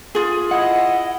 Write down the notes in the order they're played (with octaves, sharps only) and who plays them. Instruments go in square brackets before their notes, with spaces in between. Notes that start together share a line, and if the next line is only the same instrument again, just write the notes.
[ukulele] F4 G#4
[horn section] E4 D#5 [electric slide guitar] F#5